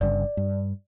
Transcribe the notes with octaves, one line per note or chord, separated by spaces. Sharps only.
G1 G2 C#3 D5
G2